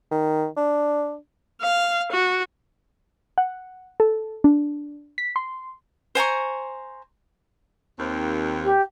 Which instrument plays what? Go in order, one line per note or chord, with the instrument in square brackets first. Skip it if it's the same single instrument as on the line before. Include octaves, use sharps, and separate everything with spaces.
[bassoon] D#3
D4
[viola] F5
F#4
[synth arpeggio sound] F#5
A4
D4
B6
C6
[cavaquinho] C5 G#5 A#5 C#6
[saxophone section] D#2 C4
[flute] G4